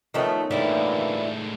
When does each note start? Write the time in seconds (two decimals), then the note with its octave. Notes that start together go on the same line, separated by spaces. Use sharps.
0.14 D#3 F3 A3 B3 C#4 D#4
0.51 A2 D3 E3 G3 G#3 A#3 E4 F4